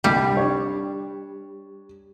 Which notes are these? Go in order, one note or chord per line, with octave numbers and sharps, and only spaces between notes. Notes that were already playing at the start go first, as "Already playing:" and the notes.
C2 D3 G3
D4 C#5